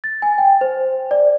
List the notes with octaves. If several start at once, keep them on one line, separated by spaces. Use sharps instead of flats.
A6
G#5
G5
C5
D5